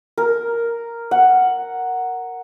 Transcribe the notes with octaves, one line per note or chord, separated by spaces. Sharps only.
A#4
F#5